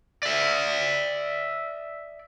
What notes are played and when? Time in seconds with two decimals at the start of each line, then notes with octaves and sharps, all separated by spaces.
0.23 D5 E5